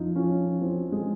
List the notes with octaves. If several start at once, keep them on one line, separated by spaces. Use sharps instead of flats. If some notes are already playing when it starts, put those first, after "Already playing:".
Already playing: F2 F3 D#4 F4
F3 C#4
F3 C4
G#3